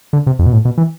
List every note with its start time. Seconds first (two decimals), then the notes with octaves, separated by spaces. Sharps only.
0.13 D3
0.27 C3
0.39 F2
0.46 B2
0.53 A2
0.65 B2
0.78 E3